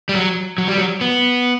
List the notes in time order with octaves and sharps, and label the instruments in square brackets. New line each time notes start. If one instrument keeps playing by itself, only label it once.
[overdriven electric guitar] G3
F#3
F#3
G3
F#3
B3